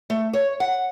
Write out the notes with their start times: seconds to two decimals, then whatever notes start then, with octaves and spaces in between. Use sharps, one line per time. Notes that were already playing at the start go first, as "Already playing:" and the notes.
0.10 A3
0.33 C#5
0.60 F#5